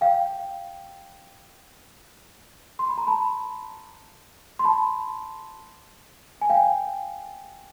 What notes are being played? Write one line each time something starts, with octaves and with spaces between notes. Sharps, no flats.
F5 G5
C6
B5
A#5
A5 B5
C6
A5 B5
G#5
F5 G5